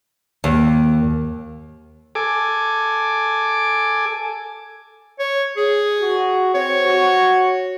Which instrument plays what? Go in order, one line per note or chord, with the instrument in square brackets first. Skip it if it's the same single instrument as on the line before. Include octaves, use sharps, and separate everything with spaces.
[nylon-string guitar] D#2
[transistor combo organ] A4 G#5 D6
[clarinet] C#5
G#4
[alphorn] F#4
[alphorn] C4 [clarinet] C#5
[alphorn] F#4